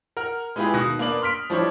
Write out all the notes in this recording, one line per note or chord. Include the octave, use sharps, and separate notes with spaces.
A#4 F#5 F6
G#3 B3 E4 F4 G4 G#4
B2 D#3 D#6 F#6 A#6
A#3 B3 D4 D5 F#7
C6 F6 B6 D7
F3 G3 D4 E4 C5 C#5